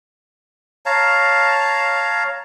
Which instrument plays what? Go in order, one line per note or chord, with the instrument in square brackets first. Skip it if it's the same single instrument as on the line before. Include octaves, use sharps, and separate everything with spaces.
[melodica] C#5 F5 A5 A#5